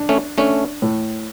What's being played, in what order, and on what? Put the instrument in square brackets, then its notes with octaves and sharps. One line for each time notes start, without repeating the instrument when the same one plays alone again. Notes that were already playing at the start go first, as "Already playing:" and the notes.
Already playing: [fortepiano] D4
[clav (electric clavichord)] A3 C#4
[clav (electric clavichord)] A3 C#4 [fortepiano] D4
[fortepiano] A2